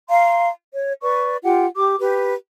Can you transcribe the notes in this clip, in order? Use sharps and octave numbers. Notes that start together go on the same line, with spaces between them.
F5 A#5 C6
C#5
B4 D5 C#6
F4 G4 F#5 G5
G4 D6
G4 B4